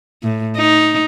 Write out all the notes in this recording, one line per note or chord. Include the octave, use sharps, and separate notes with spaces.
A2
D#4